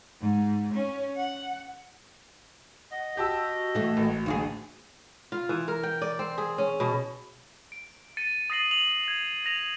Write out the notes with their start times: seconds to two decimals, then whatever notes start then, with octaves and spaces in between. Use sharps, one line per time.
0.21 G#2
0.74 C#4
1.16 F#5
2.92 D#5 F#5
3.17 F#4 G4 A5 E6
3.75 E3 A3
3.97 A1
4.26 D2 A#3 F4 G#4
5.32 F4
5.49 E3
5.68 A#4
5.83 G5
6.02 D5
6.19 C4
6.38 G#4
6.58 C#4
6.80 B2
7.72 D7
8.17 A6 C#7 D#7
8.50 D#6 A6 A#6 C7 D#7 F#7
8.71 D#6 F7 F#7
9.08 G#6
9.46 A#6 F7